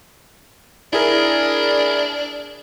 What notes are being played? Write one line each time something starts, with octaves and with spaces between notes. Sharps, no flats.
D4 E4 G#4 A#4